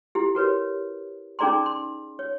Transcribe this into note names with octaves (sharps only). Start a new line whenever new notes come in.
E4 G4
F#4 A#4 B4 C#5
C#4 D#4 G#4 D5 A#5 C6
C6
C#5